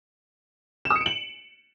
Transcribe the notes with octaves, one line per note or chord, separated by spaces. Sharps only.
E7
D#6
C#7
D7
F#7